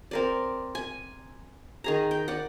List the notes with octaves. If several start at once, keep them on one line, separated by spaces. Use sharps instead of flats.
C4 A#4 D5
G#5
D#3 G#4 A#5
G5
D5 F#5